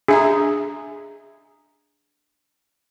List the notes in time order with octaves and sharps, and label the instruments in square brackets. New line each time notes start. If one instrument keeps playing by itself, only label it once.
[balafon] D4 E5 A#5 [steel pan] G#4